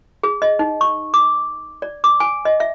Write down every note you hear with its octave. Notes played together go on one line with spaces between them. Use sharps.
G#4
D#5
D#4
C#6
D6
D5
D6
G#5
D#5
E5